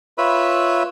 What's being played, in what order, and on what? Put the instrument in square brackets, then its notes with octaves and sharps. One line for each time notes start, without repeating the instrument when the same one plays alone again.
[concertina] F4 B4 C#5 E5 B5